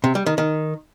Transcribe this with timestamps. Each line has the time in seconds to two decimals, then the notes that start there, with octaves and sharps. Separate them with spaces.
0.04 C3
0.15 G3
0.26 D#3
0.38 D#3